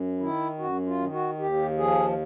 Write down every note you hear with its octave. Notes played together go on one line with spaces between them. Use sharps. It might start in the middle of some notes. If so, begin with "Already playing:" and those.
Already playing: F#2
D#3 E4
F#2 F#4
F4
D#3
F#4
D#2 G4
F3 G#4